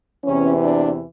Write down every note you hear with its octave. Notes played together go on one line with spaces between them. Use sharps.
E2 C3 E3 C#4
D4